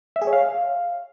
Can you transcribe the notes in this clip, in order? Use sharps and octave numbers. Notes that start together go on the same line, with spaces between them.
E5
G#4
C#5
F5